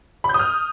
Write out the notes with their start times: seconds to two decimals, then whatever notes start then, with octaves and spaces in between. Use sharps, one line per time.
0.24 B5
0.29 G6
0.34 D#6
0.39 F6